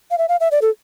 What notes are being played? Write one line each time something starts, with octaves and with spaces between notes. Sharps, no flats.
F5
E5
F5
E5
D5
A4